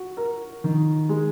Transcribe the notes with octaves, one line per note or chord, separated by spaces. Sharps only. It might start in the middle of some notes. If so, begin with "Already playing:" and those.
Already playing: F#4
A#4
D#3
G#3